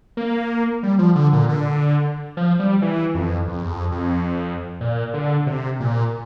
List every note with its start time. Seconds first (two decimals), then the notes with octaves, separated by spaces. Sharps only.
0.17 A#3
0.83 G3
0.99 F3
1.15 D3
1.33 A#2
1.49 D3
2.37 F3
2.59 G3
2.82 E3
3.15 F2
3.48 F2
3.63 E2
3.70 F2
3.92 F2
4.81 A#2
5.14 D3
5.47 C3
5.80 A#2